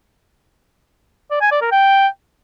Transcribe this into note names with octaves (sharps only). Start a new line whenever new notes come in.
D5
G#5
D5
A#4
G5